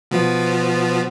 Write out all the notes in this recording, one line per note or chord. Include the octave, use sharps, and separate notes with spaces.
B2 F3 B3